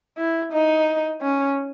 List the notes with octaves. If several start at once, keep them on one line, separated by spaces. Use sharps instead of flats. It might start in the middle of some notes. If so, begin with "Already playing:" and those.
E4
D#4
C#4